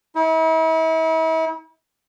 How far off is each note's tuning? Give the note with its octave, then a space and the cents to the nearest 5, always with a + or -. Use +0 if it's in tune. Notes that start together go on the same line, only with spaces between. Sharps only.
E4 -40